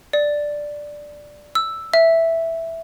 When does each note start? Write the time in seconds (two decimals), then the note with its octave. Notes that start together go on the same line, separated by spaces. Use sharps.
0.13 D5
1.55 E6
1.94 E5